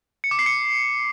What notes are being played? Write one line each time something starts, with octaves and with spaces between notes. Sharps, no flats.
C#7
D6
C7
C#7